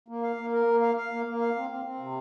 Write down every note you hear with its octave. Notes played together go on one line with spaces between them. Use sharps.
A#3
F5
A#3
A#4
A#3
F5
F5
A#3
A#3
F5
C4
C4
C4
C3